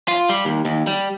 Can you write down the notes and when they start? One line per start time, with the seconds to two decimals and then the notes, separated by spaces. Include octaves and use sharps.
0.08 F4
0.29 G3
0.45 D#2
0.65 D#2
0.87 G3